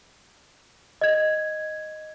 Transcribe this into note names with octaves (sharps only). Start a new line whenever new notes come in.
D#5 G#6